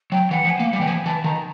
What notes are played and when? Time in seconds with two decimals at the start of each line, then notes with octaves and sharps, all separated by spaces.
0.12 F#3 G5
0.31 E3 F#5
0.45 F3
0.50 G#5
0.60 A#3
0.69 G3 F#5
0.79 E3 G5
0.87 F3 G#5
1.05 E3 A5
1.24 D#3 A#5